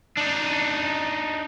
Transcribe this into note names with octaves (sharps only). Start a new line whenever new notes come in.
D4 D#4